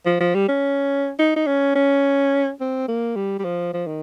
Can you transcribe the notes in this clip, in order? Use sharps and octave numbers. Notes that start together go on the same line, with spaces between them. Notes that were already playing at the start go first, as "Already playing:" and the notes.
F3
F3
G3
C#4
D#4
D#4
C#4
C#4
C4
A#3
G3
G3
F3
F3
D#3